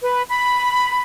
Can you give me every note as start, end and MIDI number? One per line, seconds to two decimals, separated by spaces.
0.03 0.22 71
0.29 1.03 83